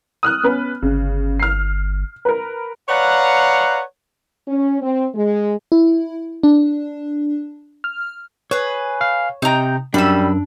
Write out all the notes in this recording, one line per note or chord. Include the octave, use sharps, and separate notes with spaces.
D#6 F6 F#6
B3 C#4 B4
G1 C#3
F6 C7
A#4 B4
B4 C#5 D5 F5 F#5 A#5
C#4
C4
G#3
E4
D4
F6
G#4 B4 C#5
F5
C3 D#4 G5 A#5
F#2 G3 D4 B5 E6